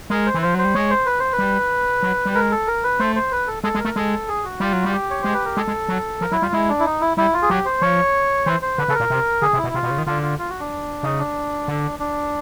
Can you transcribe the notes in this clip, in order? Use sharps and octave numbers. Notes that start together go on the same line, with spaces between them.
G#3 A#4
C5
E3
F3 C5
F#3 C5
G3
G#3 C#5
C5
B4
C5
B4
G3
F#3
G3
G#3 A#4
A4
A#4
B4
A3 C5
C5
B4
A4
G#3 A4
G#3
A#4
A3
G#3 A4
G#4
F#4
G3 F4
F#3
G3 F#4
G4
C#5
G#3 C5
B4
A#4
G#3 A4
G#3
F#3
F3 A#4
F#3 E4
G3 F4
G#3 E4
D4
E4
D#4
E4
G3 E4
F4
G#4
F#3 G4
C5
F3 C#5
E3 C5
C5
D3 B4
C#3 A4
A#4
A#2
C3
D3 G#4
C3
E4
B2
C3 F4
B2
C#3
D#3
D3 F4
F4
F4
F#4
D4
C#3 D#4
D4
D3
D4